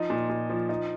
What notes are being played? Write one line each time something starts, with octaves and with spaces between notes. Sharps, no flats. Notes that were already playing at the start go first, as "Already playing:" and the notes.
Already playing: F3 D#4
A#2
A#2
F3
F3 D#4